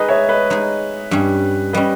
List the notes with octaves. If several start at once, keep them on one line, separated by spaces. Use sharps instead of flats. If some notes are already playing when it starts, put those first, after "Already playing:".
Already playing: G#3 D#4 G#4 B4 D#5
C#5 E5
B4 D#5
G#3 D#4 G#4
G2 G3 C#4
G3 C#4 B4 D#5